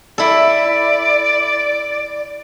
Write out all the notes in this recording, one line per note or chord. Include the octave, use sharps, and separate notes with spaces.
E4 A4 D5